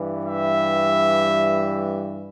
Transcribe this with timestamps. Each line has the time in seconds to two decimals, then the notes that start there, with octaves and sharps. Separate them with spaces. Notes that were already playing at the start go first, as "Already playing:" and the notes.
Already playing: G2 E3 G3
0.25 E5